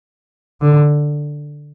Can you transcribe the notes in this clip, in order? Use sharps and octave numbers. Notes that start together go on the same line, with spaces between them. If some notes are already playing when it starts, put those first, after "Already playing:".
D3